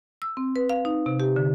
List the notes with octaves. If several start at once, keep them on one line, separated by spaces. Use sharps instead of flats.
E6
C4
B4
F5
D#4
C3
G4
D3